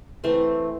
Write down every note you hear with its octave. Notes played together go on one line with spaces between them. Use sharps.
E3 A3 C4 C6